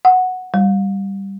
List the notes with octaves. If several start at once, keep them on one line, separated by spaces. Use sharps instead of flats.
F#5
G3